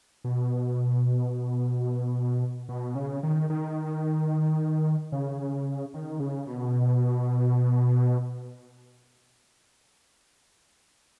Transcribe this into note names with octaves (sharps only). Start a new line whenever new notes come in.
B2
B2
C#3
D#3
D#3
C#3
D#3
C#3
B2